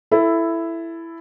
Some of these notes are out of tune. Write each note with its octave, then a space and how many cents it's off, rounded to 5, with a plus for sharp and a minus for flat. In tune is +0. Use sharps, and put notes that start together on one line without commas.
E4 +10 A4 +0